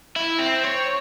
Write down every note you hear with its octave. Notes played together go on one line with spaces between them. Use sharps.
E4
C4
C#5